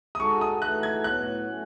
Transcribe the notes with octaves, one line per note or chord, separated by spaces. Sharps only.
D#6
G#3 D#4 F#4 A4 C#6
D#6
E3 A3 D#4 F#4 A4 F#6
G#6
A2 F#3 B3 F#4 F#6
F#3 A3 C#4 F#4